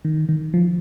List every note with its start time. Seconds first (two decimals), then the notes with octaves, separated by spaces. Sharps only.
0.05 D#3
0.29 D#3
0.54 F3